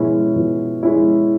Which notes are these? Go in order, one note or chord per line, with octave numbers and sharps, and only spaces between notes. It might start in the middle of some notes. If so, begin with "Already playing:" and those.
Already playing: B2 G#3 C#4 E4
B2
G#3 C#4 E4